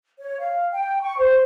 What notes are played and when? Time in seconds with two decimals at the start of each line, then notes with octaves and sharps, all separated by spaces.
0.20 C#5
0.40 F5
0.72 G5
1.02 C#6
1.18 C5